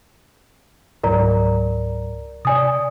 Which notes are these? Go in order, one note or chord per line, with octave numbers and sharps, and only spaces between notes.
C#2 G#2 F#3 A#4 D5 A#5
C3 D5 G#5 D#6